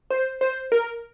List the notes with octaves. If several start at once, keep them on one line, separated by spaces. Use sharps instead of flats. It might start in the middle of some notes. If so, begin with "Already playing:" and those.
C5
C5
A#4